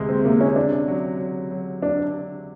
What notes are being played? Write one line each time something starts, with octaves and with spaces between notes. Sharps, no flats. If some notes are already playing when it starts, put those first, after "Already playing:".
Already playing: D2 C3 G#3
C4
C3 A#3
C#4
C#3 D4
F#3
F#3
F#3
D4